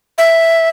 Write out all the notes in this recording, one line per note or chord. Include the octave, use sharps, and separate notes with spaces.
E5